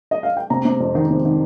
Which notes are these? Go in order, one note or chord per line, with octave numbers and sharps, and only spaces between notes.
D#5
F5
G5
C3 A#5
C3
F2
D#3
C3
D#3